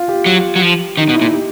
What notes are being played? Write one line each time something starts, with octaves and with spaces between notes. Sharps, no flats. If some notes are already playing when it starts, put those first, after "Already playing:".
Already playing: F4
G4
F#3
F#3
F3
D#3 D#4
B2
E4
A#2
G4